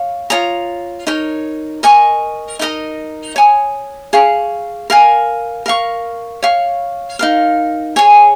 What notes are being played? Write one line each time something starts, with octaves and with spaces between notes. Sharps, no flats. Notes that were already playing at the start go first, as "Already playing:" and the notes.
Already playing: C#5 F5
F4 C#5 A#5 D#6
D#4 A#4 C#5
A#4 D#5 G#5 C#6
D#4 A#4 D#5 A#5
C#5 G#5 D#6
G#4 F5 C#6
A#4 F5 G#5
A#4 F5 C#6
C#5 F5 C#6
D#4 A#4 F5
G#4 C#5 G#5